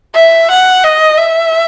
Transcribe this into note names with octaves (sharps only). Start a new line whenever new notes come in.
E5
F#5
D#5
E5